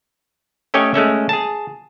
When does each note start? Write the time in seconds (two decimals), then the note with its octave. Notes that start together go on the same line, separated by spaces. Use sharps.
0.74 A3 C#4 G4 C#5 D#5 G#5
0.94 G#3 A3 C#4 E5
1.29 G#4 A5